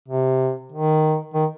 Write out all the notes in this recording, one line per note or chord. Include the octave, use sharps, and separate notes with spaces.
C3
D#3
D#3